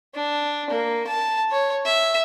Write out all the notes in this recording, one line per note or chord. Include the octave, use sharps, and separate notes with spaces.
D4
A#3
A5
C#5
E5